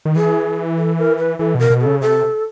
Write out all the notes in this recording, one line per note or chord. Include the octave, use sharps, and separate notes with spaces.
D#3
E3 G#4
A4
A#4
B4
E3 A4
B2 A#4
B2
A4
C#3
C3 A4